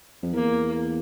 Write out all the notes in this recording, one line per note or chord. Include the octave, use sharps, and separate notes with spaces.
F2
E2 A#3